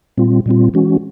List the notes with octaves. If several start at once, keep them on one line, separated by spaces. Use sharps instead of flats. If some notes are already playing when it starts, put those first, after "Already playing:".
A#2 G3 C4 F4
A#2 G3 C4 F4
E3 G#3 C#4 F#4